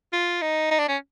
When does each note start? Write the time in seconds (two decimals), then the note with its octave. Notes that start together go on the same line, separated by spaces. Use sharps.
0.13 F4
0.42 D#4
0.71 D#4
0.79 D4
0.88 C#4